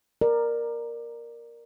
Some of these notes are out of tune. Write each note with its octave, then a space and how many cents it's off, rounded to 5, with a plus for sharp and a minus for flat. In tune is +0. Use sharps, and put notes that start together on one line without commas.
A#4 +0 D5 +20